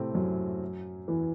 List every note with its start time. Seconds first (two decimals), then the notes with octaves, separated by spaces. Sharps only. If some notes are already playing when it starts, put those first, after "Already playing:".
Already playing: A2 C3 A3 C4
0.15 F#2 F#3
1.08 E2 E3